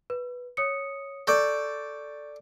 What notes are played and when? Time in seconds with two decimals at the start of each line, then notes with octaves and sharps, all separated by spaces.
0.10 B4
0.57 C#5 D#6 C#7
1.27 A4 D5 C#6 G6